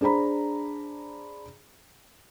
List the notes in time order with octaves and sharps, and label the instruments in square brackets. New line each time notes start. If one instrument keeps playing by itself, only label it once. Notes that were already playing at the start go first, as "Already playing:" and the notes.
[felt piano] D4 G#4 C5 A#5 B5